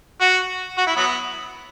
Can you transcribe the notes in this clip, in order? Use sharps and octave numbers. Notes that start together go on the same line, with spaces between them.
F#4
F#4
E4
F#3 B3